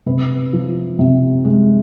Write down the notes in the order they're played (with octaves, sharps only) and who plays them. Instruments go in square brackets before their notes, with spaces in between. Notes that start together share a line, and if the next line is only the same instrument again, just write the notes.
[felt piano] C3 B4
F3
C3
G#3